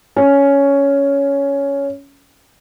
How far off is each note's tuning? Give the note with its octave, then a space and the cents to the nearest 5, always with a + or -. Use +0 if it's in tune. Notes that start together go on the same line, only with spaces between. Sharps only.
C#4 +10